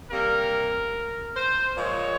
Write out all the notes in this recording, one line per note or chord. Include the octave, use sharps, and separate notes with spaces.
C3 G3 A#3 A#4
C5
A#2 F3 G#3 C#5